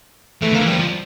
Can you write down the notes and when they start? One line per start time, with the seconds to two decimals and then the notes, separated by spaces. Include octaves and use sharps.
0.42 E3 A3
0.52 D3
0.54 A#3
0.61 E3
0.67 F3 G3
0.79 F3